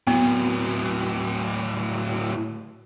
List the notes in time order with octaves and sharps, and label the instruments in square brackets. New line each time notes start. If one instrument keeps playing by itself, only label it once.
[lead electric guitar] A2 F#3 [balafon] B3